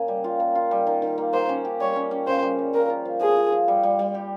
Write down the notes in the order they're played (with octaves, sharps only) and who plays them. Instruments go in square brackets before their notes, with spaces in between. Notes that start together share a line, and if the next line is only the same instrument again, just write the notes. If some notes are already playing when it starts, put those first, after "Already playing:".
Already playing: [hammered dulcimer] C#3 A#3 C#4 G#4
G3
F4
A#3
F4
G3
D#3
D#3
A#3
[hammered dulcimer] A#3 [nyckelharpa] C5
[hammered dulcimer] C#4
G4
[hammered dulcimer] G3 [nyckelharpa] C#5
[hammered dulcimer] C#4
C#4
[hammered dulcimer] C#3 [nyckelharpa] C5
[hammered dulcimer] G3
G3
[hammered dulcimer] F3 [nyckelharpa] A#4
[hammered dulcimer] F4
F3
[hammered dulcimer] F3 [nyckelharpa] G#4
[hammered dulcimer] F3
F3
G3
G3
G3
G4